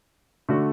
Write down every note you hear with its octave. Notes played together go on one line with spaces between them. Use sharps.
D3 A3 D4 F#4